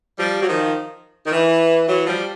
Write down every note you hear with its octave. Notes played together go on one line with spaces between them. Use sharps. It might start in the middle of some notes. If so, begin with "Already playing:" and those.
F3 G3
F#3
D#3 F3
D#3
E3
E3 F#3
F3 G3